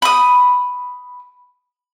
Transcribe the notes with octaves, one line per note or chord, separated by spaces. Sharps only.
B5 D#6